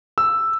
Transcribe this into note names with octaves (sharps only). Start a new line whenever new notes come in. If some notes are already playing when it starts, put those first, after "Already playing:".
E6